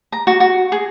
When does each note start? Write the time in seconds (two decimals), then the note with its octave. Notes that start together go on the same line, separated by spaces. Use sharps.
0.12 A#5
0.27 F#4
0.40 F#4
0.72 G#4